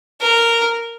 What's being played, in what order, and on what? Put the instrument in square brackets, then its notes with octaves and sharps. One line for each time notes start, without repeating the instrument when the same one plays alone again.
[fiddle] A#4